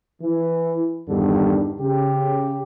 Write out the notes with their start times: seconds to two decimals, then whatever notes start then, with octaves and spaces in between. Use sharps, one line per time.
0.22 E3
1.08 E2 G2 D3 D#3
1.80 C#3 G4